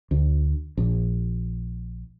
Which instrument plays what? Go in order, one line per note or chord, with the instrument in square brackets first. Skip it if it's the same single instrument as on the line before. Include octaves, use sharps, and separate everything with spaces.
[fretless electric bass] D2
A#1